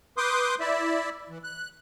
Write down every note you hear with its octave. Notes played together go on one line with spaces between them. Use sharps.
B4 C6 D6 D#6 G6
E4 D5 E5
E3
F#6